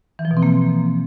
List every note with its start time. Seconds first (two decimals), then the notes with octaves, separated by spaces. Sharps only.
0.19 E3
0.25 F3
0.31 B2
0.37 C4
0.43 A#3